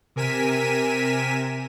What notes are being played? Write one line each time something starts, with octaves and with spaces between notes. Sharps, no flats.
C3 A#4 G#5 B6 D#7 E7